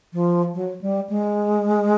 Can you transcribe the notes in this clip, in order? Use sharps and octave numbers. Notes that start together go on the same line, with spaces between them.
F3
F#3
G3
G#3